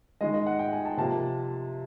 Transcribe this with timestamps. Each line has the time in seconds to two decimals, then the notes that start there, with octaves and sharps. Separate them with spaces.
0.21 D#3 G#3 D#5
0.34 D#5
0.46 F#5
0.59 G5
0.73 G#5
0.85 A5
0.97 C3 F3 A#3 A5